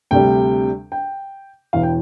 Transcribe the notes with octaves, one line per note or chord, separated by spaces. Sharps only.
D2 C3 G3 D4 G5
G5
E1 E2 E3 F5
G5